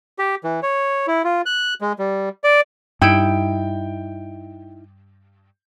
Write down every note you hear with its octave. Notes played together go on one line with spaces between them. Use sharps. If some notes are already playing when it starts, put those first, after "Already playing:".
G4
E3
C#5
E4
F4
F#6
G#3
G3
D5
G2 D#4 E4 G5 D7